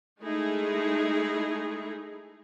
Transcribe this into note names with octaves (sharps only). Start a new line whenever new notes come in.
G#3 A3 D#4 E4 G#4